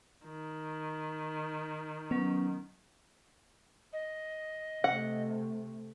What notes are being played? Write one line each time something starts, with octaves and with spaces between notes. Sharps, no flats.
D#3
F#3 B3 C#4
D#5
C3 A3 F#5